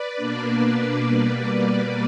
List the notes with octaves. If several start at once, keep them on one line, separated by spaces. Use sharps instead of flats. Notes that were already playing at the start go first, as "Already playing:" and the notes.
Already playing: B4 D5
B2 A#3 D4
B2 G3 A#3